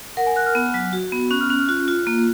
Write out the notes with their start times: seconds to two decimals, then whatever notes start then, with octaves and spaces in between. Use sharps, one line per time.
0.17 A#4 F#5
0.27 G#5
0.36 A#4 F#6
0.46 F6
0.55 B3
0.74 F#3
0.93 F#4
1.12 B3
1.31 C#4 F#6
1.41 F6
1.49 C#4 F#6
1.59 F6
1.68 F4 F#6
1.88 F4
2.07 A#3